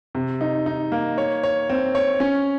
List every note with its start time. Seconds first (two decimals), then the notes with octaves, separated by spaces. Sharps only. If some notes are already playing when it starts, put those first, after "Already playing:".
0.15 C3
0.41 D#4
0.66 D#4
0.92 A#3
1.18 C#5
1.43 C#5
1.69 C4
1.95 C#5
2.20 C#4